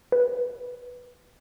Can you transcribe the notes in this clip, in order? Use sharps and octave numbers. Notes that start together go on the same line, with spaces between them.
B4